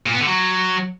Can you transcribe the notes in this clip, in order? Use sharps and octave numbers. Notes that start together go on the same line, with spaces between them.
A#2
B3
D3
F#3